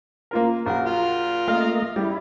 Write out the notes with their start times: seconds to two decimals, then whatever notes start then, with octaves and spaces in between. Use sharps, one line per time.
0.31 A#3 F4 A#4
0.66 A#1 F#3 A#4 F#5
0.86 F4 A#4
1.48 A3 A#3 D#5 F5 F6
1.96 G3 E4